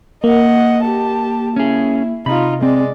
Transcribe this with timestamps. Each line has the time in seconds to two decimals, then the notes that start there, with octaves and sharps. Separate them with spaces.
0.24 A#3 D#5 F#5
0.83 G4 A5
1.56 C#4 E4 G#4
2.26 C3 D#4 F4 B5
2.63 G#3 C4 D5